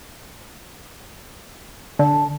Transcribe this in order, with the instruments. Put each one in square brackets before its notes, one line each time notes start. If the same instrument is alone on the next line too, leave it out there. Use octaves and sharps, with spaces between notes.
[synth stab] D3 [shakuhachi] A5